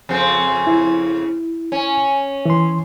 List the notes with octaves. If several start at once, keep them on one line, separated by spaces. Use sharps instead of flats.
F2 C#3 C4
E4
C#4
E3 C6